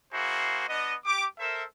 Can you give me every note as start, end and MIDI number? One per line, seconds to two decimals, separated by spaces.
0.13 0.63 58
0.13 0.63 64
0.13 0.63 66
0.13 0.63 68
0.13 0.63 72
0.68 0.94 59
0.68 0.94 62
0.68 0.94 75
1.05 1.26 67
1.05 1.26 86
1.39 1.63 69
1.39 1.63 70
1.39 1.63 72
1.39 1.63 76